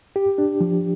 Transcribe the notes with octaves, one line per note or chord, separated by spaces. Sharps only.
G4
D4
F3